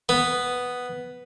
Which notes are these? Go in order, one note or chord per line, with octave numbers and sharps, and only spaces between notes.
B3